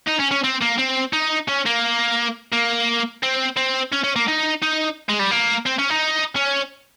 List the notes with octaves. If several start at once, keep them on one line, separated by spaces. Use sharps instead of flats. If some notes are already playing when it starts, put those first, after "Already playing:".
D#4
C#4
C#4
C4
A#3
C4
D#4
C#4
A#3
A#3
C4
C4
C#4
C#4
A#3
D#4
D#4
G#3
G3
A#3
C4
C#4
D#4
C#4